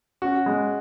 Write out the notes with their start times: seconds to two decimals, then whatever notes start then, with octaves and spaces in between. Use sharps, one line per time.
0.22 C#4 F#4
0.46 G#3